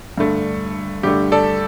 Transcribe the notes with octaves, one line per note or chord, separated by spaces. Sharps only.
G2 D3 A3
G2 D3 A3 G4
A4 D5